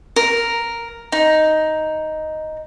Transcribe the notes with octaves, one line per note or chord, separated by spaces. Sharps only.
A#4
D#4